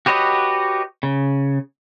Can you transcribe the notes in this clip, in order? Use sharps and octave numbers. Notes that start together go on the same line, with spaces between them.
F#4 G4 B4 C#5 D#5
C#3